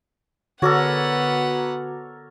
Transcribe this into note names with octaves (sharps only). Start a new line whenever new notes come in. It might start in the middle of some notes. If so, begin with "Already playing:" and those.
D3 B3 F#4 A4 A#4 C#5 F#5 D6